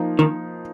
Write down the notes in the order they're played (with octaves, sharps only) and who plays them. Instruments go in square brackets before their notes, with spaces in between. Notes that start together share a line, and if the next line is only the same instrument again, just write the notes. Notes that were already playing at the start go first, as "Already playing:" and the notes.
Already playing: [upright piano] F3 A#3 D#4
[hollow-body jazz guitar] D#3